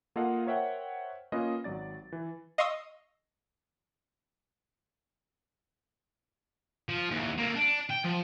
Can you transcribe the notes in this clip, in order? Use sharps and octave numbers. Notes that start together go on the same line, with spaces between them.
A#3 F4 A4 D#5 F5 F#5
A#4 C5 C#5 E5 F#5 G5
A#3 C#4 F4 A#4 B4 D#5
G#1 F#3 D5 A6
E3
D#5 F5 C6 C#6 D#6 E6
F3
D#2 E3
A#3 A4
D4
G5
F3